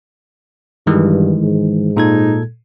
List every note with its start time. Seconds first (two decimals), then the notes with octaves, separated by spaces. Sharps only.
0.87 G2 D#3 E3 G#3
1.42 G#2
1.97 A#2 D#4 A4 G#6